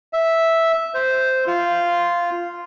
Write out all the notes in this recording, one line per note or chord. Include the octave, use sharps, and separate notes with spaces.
E5
C5
F4